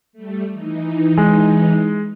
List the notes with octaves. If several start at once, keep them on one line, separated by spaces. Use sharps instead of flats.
G3 A3
E3 D#4
G#3